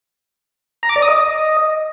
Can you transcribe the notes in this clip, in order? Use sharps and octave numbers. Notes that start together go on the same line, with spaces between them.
A#5
D6
D5
D#6
D#5